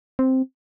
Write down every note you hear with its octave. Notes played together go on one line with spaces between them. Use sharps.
C4